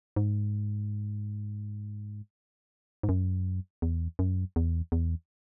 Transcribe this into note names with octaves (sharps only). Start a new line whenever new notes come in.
G#2
G#2
F#2
E2
F#2
E2
E2